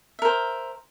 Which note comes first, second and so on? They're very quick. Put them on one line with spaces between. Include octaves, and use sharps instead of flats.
E5 A#4 C5